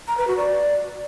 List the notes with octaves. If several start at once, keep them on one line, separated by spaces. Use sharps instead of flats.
A#5
B4
F#4
D5